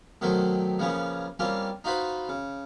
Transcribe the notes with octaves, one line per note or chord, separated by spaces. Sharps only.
B2 D#3 F#3 A3 C4
C#3 F3 A#3 B3 C#4
G3 A#3 C4 C#4 F4
D#4 F4 F#4 B4 C5
C#3